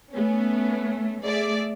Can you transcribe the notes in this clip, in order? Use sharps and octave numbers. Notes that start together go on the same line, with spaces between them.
A3 B3 C#4
A3 G#4 D5 E5